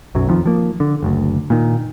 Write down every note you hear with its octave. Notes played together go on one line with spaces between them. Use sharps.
B1 F#2 F#3
F2 D#3 F3
F3 A#3
D3
F#1 D2
A#2 D#3